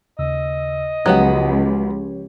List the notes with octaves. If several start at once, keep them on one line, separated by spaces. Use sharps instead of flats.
D#2 C#3 D#5 E6
C#2 F3 F#3 B3 G4 C#5 F#5